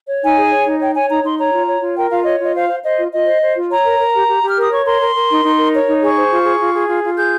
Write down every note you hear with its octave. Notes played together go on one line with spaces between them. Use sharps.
C#5
D#4 G#5
G#4
C#5
D#4
C#5 G5
C#5 G#5
D#4 A#5
D#4 C6
C#5 A#5
F4
C#5
F4
A#4 G5
F4 F5
C#5 D#5
F4 D#5
C5 F5
C5
C5 D#5
F4
F4 D#5
C5
C5
F4
C#5 A#5
A#4
A#4
G4
G4
G4
F6
A#4 D#6
C#5 C#6
A#4 C6
A#4
A#4
D#4
D#4
A#4
C#5
D#4
G#4 C#6
C5
F4
G#4
F4
G#4
F4
F4
G#4 G6